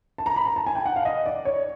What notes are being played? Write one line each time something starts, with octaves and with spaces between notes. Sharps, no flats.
A5
A#5
B5
A#5
A5
G#5
G5
F#5
F5
D#5
D5
C#5